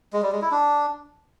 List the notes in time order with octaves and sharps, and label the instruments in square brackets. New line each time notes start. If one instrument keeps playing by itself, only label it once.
[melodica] G#3
G3
G#3
E4
D4